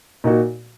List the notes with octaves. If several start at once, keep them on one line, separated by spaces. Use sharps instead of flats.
A#2 A#3 D#4 F#4